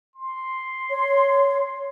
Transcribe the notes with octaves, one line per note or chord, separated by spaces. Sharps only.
C6
C#5